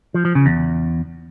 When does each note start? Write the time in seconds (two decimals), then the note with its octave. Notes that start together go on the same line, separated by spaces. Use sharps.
0.14 F3
0.25 F3
0.35 C#3
0.46 E2